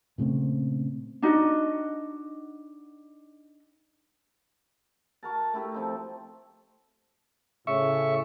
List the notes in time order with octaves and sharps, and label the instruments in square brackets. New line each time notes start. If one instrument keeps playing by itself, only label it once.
[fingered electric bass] A#2 C#3 A3 C4
[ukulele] D4 D#4 F#4 D#5
[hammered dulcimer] F#4 A#4 A5
A3 E4 G4 A4
F3 C4 D#4
[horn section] A2 C#3 [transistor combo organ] E5 C#6